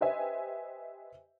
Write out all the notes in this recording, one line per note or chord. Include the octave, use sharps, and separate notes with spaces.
G4 B4 C5 D#5 E5 G#5